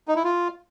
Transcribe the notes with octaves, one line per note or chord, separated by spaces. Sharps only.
D#4
E4
F4